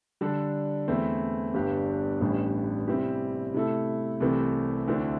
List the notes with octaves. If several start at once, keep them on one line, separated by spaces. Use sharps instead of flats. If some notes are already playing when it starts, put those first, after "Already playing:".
D3 G3 D4 A4
E2 E3 A3 C4 E4
G1 G2 G3 D4 G4
A1 A2 G3 D4 G4
C3 G3 C4 E4 G4
C3 A3 E4 A4
C2 C3 E3 A3 C4
D2 D3 C4 E4